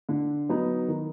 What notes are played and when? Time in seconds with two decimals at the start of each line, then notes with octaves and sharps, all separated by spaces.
0.09 D3
0.49 F#3 B3 D#4
0.88 D#3